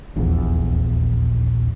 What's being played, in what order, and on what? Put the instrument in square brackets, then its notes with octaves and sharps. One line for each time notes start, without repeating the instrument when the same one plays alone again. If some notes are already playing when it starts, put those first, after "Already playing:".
[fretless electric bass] D#1 A#1 E2